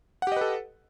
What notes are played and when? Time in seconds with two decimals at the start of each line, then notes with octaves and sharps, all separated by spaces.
0.22 F#5
0.27 G4
0.32 D#5
0.36 B4
0.41 A4